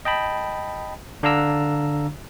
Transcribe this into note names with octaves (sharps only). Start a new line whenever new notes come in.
D#5 G5 A5 B5
D3 D4 F5 A#5 E6